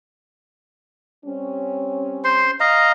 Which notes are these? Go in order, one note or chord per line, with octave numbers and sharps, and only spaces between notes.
G3 C4 C#4
C5 C6
D#5 F5 A#5